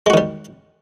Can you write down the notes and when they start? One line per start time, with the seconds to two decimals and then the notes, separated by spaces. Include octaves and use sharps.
0.06 G#3
0.10 F#4
0.14 D#3
0.17 G3